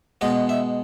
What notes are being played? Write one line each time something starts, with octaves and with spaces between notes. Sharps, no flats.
B2 G#3 B3 D#5
E5